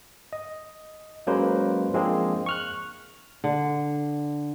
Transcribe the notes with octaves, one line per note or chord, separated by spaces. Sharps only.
D#5
F#3 G#3 A#3 C#4 B4 C5
F3 G#3 A#3 C4 D4 G#4
C#6 F6 F#6
D3